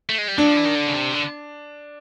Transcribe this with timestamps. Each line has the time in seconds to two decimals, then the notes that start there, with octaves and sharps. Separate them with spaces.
0.09 A3
0.18 G#3
0.28 G3
0.37 F#3 D4
0.47 F3
0.57 E3
0.66 D#3
0.76 D3
0.88 C#3
0.95 C3
1.14 D3